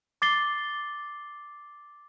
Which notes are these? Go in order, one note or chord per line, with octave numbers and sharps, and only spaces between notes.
D6 A6 C7 G7